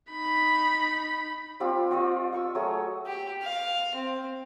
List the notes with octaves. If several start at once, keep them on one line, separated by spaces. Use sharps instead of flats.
D#4 B5
G3 C4 F4 G4
F4 D5 D#5
D#5 C#6 E6
F#3 A3 G#4 C#5
G4
F5
C4